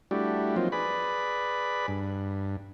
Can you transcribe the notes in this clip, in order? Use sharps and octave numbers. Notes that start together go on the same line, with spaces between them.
G3 A3 D4 E4 F#4 G4
F3 F#3 A#3 C4 D#4 F4
G#4 B4 D5 B5
G2